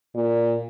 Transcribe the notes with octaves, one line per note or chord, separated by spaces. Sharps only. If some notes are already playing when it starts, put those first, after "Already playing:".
A#2